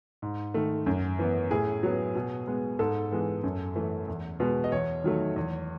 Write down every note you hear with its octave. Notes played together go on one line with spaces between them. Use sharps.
G#2
D#3 A3
F#2
E3 B3
A2 G#4
F#3 B3
B2
G#3 B3
G#2 A4
E3 G#3 B3
F#2
E3 A3
E2
B2 G#3 B3
D#5
E2 C#5
D#3 F#3 A3
E2